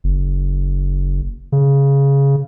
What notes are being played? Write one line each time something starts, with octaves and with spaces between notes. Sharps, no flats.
F#1
C#3